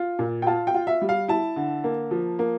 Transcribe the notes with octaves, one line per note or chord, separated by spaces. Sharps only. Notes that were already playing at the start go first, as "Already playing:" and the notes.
Already playing: F4
A#2
G5
F4 A5
G5
F4
E5
G3
F5
E4 A5
D3
A#3
F3
A#3